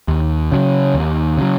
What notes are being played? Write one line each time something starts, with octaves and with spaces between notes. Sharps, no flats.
D#2
C#3 F#3
D#2
C#3 F#3